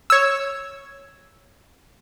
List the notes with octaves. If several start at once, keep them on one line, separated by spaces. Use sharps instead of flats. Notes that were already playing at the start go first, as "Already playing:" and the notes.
C#5 E6